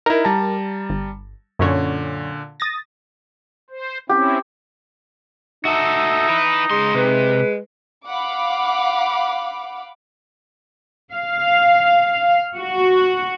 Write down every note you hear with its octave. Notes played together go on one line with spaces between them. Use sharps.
D#4 E4 A#4
G3 A5 A#5
G1
F#2 A#2 D3 C#4 C#5
D#6 A6 A#6
C5
C4 C#4 E4 G4
D#4 F#4 A4 E5
E4 B4
C#2 G#3 C6
C3 B4
F5 F#5 B5 D6
F5
F#4